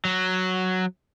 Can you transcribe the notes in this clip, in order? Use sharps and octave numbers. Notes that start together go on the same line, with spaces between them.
F#3